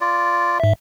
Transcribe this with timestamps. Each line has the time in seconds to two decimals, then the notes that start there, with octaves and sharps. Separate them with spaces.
0.01 F4 D5
0.60 G#2 E5